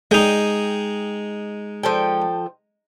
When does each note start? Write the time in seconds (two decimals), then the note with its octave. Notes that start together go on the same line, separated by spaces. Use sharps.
0.11 G#3 D#4 G5
1.83 F3 A4 G5